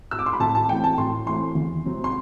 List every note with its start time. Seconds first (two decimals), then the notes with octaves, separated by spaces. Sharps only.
0.11 E6
0.19 D6
0.26 C6
0.33 B5
0.40 A2 A5
0.55 A5
0.69 E3 A3 C4 G5
0.84 A5
0.98 A2 C6
1.26 E3 A3 C4 C6
1.55 E2
1.84 C3 F#3 C4
2.04 C6